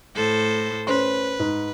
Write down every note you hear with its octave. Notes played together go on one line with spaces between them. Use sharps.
A2 A4 C5
C#4 B4 C5 C6
G#2